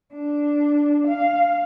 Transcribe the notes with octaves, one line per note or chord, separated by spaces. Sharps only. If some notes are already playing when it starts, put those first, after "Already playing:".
D4
F5